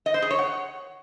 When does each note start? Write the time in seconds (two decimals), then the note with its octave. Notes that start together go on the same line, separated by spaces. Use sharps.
0.06 D#5
0.14 C5
0.22 G#4
0.31 C#5
0.39 F#5